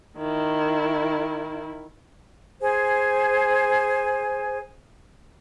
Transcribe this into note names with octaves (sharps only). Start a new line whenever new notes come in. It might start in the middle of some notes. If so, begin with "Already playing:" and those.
D#3 E4
G#4 C5 G#5